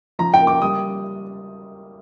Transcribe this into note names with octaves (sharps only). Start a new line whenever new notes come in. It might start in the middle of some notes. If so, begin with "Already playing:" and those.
F3 A#5
G5
A#3
D6
G3 D#6